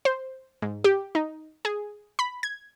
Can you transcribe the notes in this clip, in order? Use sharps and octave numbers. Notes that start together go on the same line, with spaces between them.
C5
G#2
G4
D#4
G#4
B5
G#6